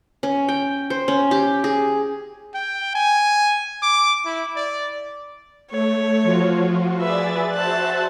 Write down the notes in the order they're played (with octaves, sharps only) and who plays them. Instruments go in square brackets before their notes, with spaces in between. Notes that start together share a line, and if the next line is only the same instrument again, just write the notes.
[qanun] C#4
G5
C5
C#4
G4
G#4
[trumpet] G5
G#5
D6
E4
D5
[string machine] A3 [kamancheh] C#5
[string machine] F3 F4 F#4
[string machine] G#4 D5 A6 [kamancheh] B4 E5
[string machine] F#4 C5 E5 [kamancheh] A5 F#6